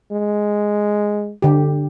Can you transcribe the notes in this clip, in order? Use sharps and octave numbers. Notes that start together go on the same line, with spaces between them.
G#3
D3 G4